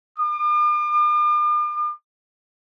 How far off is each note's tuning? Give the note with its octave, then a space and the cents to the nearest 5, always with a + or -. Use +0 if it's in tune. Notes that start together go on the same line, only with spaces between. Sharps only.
D6 +45